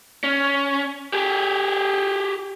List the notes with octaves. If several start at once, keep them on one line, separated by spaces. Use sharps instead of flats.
C#4
G4 G#4